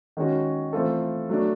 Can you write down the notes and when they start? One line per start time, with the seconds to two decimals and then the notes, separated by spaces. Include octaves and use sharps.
0.17 D#3 G#3 C#4 F#4
0.73 E3 A3 C4 F4 A4
1.29 F#3 A3 D4